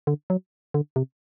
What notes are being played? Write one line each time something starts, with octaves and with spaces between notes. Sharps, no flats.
D3
F#3
D3
C3